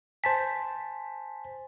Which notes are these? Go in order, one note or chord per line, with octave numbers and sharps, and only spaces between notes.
C5 G#5 A5 B6